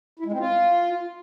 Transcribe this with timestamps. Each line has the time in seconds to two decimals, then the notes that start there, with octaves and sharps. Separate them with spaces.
0.19 E4
0.26 G#3
0.32 C4
0.39 F4